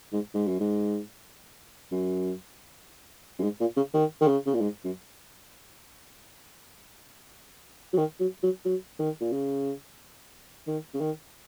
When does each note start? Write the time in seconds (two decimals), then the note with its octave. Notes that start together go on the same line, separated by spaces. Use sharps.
0.13 G#2
0.35 G#2
0.47 F#2
0.60 G#2
1.92 F#2
3.39 F#2
3.43 G#2
3.61 A#2
3.77 C#3
3.94 D#3
4.21 D#3
4.28 C#3
4.46 C#3
4.54 A#2
4.61 G#2
4.84 F#2
7.93 F#3
7.97 D#3
8.20 F#3
8.43 F#3
8.65 F#3
8.99 D#3
9.21 A#2
9.32 C#3
10.67 D#3
10.94 C#3
11.01 D#3